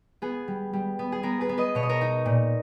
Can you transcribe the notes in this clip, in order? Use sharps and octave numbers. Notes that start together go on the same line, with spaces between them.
B3 G#4
G3
G3
B3
G#4
B3 A#4
G#4 B4
B3
B4 D#5
B2 C#5
D#5
A#4 C#5
D#4
A#2